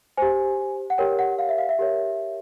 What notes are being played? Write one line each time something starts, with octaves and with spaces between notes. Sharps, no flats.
G4 C5 G#5
F#5
G4 A#4 C#5 G5
F#5
F5
E5
F5
E5
G4 A#4 C#5